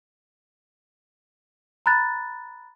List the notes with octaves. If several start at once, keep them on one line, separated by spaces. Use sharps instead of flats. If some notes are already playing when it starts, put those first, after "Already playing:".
A#5 B5 F#6 A6